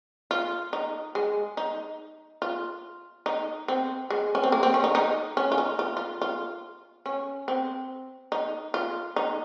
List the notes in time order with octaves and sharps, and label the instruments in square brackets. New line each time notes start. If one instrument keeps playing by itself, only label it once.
[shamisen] F4
D#4
G#3
D#4
F4
D#4
C4
G#3
C#4
C4
A#3
C4
C#4
D#4
D#4
C#4
F4
D#4
F4
F4
F4
C#4
C4
D#4
F4
D#4